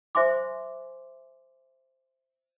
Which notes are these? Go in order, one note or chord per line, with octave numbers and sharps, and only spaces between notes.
C5 E5 G#5 C6 D6